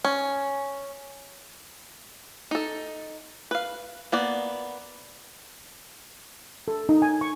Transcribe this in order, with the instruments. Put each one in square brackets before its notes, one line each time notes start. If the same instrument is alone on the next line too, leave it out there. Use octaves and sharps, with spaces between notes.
[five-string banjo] C#4
D#4 A4
B4 F5
A#3 B3 D5
[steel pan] A4
D#4
G#5
C#6